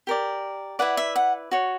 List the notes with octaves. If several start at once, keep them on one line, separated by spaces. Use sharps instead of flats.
G4 A#4 D5
E4 B4 D5 F#5
E5
F#5
F#4 C#5